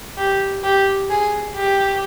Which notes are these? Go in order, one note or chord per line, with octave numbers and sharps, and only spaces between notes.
G4
G4
G#4
G4